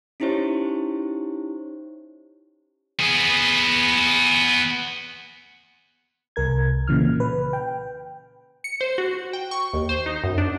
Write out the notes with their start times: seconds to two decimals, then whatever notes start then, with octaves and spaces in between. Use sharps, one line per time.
0.20 C#4 D#4 E4 G4 C5 C#5
3.00 B3 G#4
6.36 C2 A#4 G#6
6.88 A#2 C#3 E3 F6
7.20 B4
7.53 G5
8.64 C#7
8.81 C5
8.98 F#4
9.33 G5
9.51 C#6
9.74 D#2
9.89 C5
10.06 D#4
10.24 F#2
10.38 D4